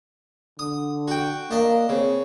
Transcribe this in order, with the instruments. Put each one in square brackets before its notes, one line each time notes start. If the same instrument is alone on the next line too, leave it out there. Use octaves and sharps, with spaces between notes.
[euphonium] D3 [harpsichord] D#6
[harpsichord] F#4 G5
[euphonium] A#3 [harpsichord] D4 D#5
[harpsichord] C#3 [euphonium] C4